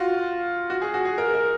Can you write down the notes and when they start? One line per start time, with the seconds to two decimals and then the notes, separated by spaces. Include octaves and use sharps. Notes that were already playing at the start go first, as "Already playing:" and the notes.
Already playing: F4 F#4
0.70 F#4
0.82 G#4
0.94 F#4
1.05 G#4
1.18 A#4
1.34 A#4